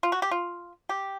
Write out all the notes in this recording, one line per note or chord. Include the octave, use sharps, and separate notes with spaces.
F4
F#4
G4
F4
G4